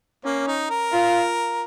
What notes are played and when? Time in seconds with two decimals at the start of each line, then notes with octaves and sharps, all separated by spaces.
0.24 A#3 C#4
0.47 D#4
0.70 A#4
0.92 F4